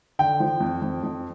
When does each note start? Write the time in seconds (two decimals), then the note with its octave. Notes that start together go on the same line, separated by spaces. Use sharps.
0.19 D3 G5
0.40 F3
0.60 F2
0.82 F2
1.03 F2